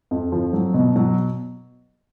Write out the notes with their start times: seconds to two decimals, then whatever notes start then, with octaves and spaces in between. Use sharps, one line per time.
0.11 F2
0.32 F3
0.53 F#3
0.74 B2
0.96 F#3